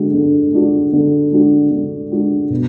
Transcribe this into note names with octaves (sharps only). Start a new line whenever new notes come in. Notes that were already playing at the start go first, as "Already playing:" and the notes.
Already playing: D3 G#3 D4 F#4
D3
G#3 D4 F#4
D3
G#3 D4 F#4
D3
G#3 D4 F#4
B2